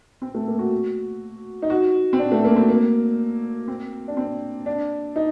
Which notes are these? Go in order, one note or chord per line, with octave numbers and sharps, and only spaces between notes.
C4
A3
A#3
F#4
D#4
F#4
C4
D4
A3
A#3
C4
A#3
C4
D4
C4
D4
D#4